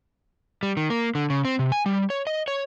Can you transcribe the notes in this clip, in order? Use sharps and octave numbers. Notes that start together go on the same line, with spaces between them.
G3
D#3
A#3
D3
C#3
C4
C3
G#5
G3
C#5
D#5
C#5